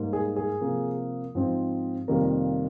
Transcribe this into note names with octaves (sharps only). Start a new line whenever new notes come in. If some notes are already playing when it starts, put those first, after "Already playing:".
Already playing: G#2 G3 A#3
G#4
G#4
C3 F3 A#3
G#2 F3 C4
F2 C3 D#3 G3 A#3 A#4